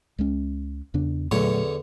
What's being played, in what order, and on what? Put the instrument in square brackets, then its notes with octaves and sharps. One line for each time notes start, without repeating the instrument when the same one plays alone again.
[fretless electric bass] C#2 G#3 C#4
E2 C#3 D4
[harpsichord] E2 D3 C#5 [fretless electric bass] A#2 F#3 A3